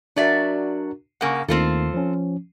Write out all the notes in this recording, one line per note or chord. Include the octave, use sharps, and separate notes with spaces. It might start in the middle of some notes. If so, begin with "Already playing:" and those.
F#3 D4 F#4 A#4 D5 E5
C#3 A#3 F#5 G#5 C#6
D#2 D#3 A3 C4 F4 A4
F3 C#4